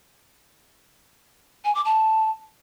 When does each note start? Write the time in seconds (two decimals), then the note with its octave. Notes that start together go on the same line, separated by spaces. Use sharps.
1.65 G#5
1.75 D6
1.85 A5